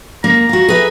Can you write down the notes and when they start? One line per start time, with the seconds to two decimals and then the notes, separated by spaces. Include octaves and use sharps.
0.24 A#3 A#5
0.49 F#4 F5
0.69 G#4 B4 E5